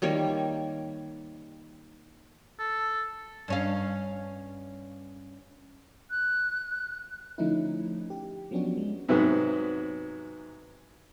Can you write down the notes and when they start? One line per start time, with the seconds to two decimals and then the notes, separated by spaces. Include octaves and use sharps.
0.02 D#3 G3 A#3 C#5
2.59 A4
3.48 G2 C#4 F5
6.11 F#6
7.38 D3 F3 A3 C#4 D#4 E4
8.10 G4
8.51 F3 F#3 B3 C#4 D4 F#4
8.77 G#3
9.09 G#2 C3 F#3 B3